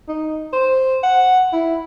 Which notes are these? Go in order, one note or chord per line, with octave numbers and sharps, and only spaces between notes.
D#4
C5
F#5
E4